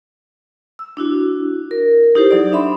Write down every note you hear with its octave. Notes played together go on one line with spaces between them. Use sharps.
E6
D4 E4 F#4
A#4
D#4 E4 G4 A4 C5
F#3 D#4 G#4 D5
D4 E5 B5 C6